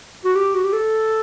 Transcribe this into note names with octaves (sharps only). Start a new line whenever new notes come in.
F#4
G4
F#4
G4
A4